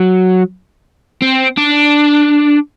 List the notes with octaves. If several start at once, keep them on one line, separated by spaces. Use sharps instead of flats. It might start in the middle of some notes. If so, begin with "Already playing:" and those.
Already playing: F#3
C4
D4